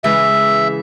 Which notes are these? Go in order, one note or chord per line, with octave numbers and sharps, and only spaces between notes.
C#3 E3 G#3 E5